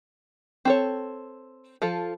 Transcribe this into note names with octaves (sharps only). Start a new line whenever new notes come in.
C4 A4 C#5
F3 F4 A4